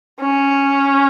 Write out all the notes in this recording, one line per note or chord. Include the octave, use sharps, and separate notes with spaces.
C#4